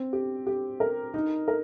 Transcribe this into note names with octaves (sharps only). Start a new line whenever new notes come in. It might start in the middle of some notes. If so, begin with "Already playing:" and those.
Already playing: C4
G4
G4
A#4
D#4
A#4